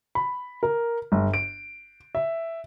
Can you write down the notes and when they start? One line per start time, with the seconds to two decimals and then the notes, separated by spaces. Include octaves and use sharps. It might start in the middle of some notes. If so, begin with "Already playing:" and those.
0.15 B5
0.63 A#4
1.12 G1
1.34 D7
2.15 E5